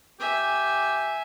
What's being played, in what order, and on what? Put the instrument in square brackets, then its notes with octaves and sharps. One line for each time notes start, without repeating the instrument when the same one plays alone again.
[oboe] G4 [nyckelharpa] E5 G#5